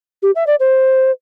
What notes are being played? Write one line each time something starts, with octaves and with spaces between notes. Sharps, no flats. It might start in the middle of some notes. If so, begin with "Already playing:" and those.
G4
E5
D5
C5